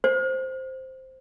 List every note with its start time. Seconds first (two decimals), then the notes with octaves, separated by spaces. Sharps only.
0.04 C5